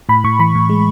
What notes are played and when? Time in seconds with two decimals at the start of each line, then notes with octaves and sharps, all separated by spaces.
0.09 A2 B5
0.24 A2 C#6
0.39 E3 B5
0.55 A2
0.70 G#3